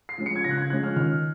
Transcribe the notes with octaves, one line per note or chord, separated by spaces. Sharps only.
C7
F3 G#3 C#4
C#7
G#6
C#3 A#6
F#6
G#6
F3 G#3 C#4 F#6
F6
D#3 F6